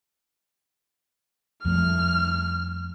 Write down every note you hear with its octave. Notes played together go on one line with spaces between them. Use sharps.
F2 F3 G3 A3 F6